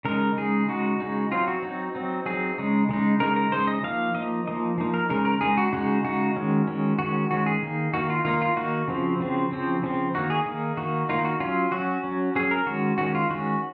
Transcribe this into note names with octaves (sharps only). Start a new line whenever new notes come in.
C#3 G#3 D#4 A#4
C#3 G#3 D#4 G#4
C#3 G#3 D#4 F#4
C#3 G#3 D#4
F#3 C4 D#4 F4
F#4
F#3 C4 D#4
F#3 C4 D#4
F#3 C4 D#4 G#4
C#3 G#3 D#4
C#3 G#3 D#4
C#3 G#3 D#4 A#4
A#4
C#3 G#3 D#4 C5
D#5
F3 A#3 D#4 F5
F3 A#3 D#4 D#5
F3 A#3 D#4 D#5
F3 A#3 D#4
A#4
C#3 G#3 D#4 A#4
A#4
C#3 G#3 D#4 G#4
F#4
C#3 G#3 D#4 F#4
C#3 G#3 D#4 F#4
D#3 G#3 C#4
D#3 G#3 C#4
D#3 G#3 C#4 F#4
D#3 G#3 C#4 F#4
G#4
D#3 A#3 D#4
D#3 A#3 D#4 F#4
F4
D#3 A#3 D#4 F4
F4
D#3 A#3 D#4 F#4
C#3 F3 C4
C#3 F3 C4
C#3 F3 C4
C#3 F3 C4
D#3 A#3 D#4 F#4
G#4
D#3 A#3 D#4
D#3 A#3 D#4 F#4
D#3 A#3 D#4 F4
F#4
F#3 C#4 F4
F#3 C#4 F#4
F#3 C#4
F#3 C#4 G#4
A#4
D#3 G#3 C#4 F#4
D#3 G#3 C#4 F#4
F4
D#3 G#3 C#4 F#4